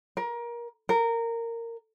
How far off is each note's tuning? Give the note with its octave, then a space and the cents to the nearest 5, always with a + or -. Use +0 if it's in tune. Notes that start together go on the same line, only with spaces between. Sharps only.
A#4 +25
A#4 -15